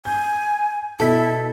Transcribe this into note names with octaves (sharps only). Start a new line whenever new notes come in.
G#5 G6
B2 E4 A4 B6